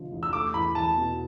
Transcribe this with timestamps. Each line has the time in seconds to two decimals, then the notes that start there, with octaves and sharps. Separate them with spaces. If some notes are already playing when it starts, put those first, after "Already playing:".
Already playing: F1 D3 F3
0.12 E2
0.23 E6
0.33 A3 D6
0.54 E2 B5
0.75 E2 A5
0.97 B2